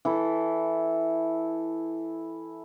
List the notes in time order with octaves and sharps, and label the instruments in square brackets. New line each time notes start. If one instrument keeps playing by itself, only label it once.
[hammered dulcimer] E3 E4 A4